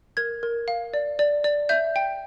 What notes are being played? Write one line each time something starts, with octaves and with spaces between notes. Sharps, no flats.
A#4 G#6
A#4
F5
D5
D5
D5
E5 G6
G5